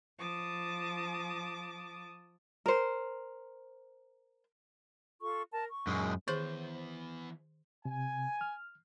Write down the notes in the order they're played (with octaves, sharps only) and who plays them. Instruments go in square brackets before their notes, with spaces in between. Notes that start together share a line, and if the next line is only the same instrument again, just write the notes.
[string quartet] F3 A5 D6 D#6
[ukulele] A#4 C5
[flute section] F4 A4 C#6
A#4 A5
C#6
[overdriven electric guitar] F#2 G#3
[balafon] D#3 G#4 [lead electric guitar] E3 B3 [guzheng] C5
[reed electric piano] C3 [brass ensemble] G#5
[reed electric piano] F6